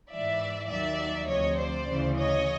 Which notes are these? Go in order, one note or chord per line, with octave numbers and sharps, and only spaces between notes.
G#2 E3 D5 E5
D#2 D#3 F#3 D5 E5
D2 C3 F3 C#5 D#5
C5 D5
D2 C#3 E3
C#5 D#5